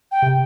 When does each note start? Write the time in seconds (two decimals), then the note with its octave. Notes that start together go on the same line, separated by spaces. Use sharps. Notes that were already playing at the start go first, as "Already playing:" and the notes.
0.12 G5
0.22 C3